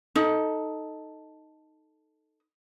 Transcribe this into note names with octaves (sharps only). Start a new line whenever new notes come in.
D#4 A4